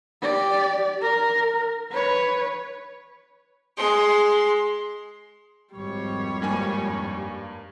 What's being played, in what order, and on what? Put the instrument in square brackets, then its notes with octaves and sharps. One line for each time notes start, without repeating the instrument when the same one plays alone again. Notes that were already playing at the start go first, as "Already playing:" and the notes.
[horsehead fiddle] G4 D5
A#4
B4 C#5
[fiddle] G#3 C6
[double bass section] G#1 F2 [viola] G3 C#5
[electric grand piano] G2 A#3 G#5